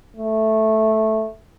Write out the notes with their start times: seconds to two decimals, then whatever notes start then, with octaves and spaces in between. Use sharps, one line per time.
0.16 A3